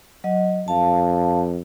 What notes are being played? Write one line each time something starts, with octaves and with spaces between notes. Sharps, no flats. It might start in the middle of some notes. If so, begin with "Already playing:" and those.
F#3 D#5 F#5
F2 F5 A5